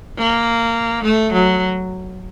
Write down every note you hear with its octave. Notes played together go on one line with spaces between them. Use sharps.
A#3
A3
F#3